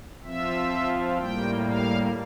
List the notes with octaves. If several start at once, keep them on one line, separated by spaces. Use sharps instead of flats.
F3 C4 F4 E5
A2 G3 A#3 G5
F5